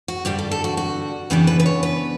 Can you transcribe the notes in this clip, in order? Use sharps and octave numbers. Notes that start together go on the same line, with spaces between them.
F#4
G2 D3 G3 D4 G4
A4
A4
F#4
F#4
C#3 E3 B3 D4 G4
B4
B4
C#5
B4